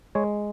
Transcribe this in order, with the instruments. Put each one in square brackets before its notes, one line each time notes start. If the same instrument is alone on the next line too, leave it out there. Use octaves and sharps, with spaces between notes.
[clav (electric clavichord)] G#3 C#5